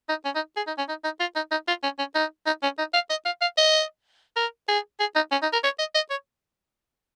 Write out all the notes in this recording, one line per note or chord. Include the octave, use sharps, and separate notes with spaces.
D#4
C#4
D#4
G#4
D#4
C#4
D#4
D#4
F4
D#4
D#4
F4
C#4
C#4
D#4
D#4
C#4
D#4
F5
D#5
F5
F5
D#5
A#4
G#4
G#4
D#4
C#4
D#4
A#4
C#5
D#5
D#5
C#5